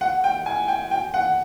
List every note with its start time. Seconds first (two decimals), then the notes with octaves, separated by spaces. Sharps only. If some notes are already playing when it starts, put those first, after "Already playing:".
0.01 F#5
0.24 G5
0.46 G#5
0.68 G5
0.91 G5
1.14 F#5